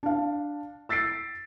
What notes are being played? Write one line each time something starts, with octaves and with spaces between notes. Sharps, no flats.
D4 F5
E6 A6 B6 C7 D7